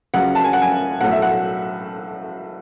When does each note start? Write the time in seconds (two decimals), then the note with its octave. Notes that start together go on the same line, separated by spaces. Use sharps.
0.14 C#2 C#3 F#3 F#5
0.35 A5
0.44 G#5
0.53 F#5
0.62 G#5
1.00 B1 A2 F#3 A3 F#5
1.12 E5
1.22 F#5